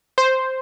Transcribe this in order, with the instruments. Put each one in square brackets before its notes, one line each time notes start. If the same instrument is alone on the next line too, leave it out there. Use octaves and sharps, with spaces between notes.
[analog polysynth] C5